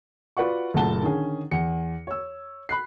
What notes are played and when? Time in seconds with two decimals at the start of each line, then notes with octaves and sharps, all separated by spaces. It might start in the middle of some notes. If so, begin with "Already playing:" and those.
0.37 F4 F#4 B4 D5 F#5 C#6
0.74 F#1 A#2 A3 F#5 A5 G7
1.03 D3 D#3 C#4 G#4
1.51 E2 C#7
2.07 C#5 E6
2.69 B5 F#6 C7